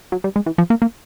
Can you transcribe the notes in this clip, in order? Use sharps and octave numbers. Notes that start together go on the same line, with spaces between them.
F#3
G3
G#3
E3
F3
A#3
A#3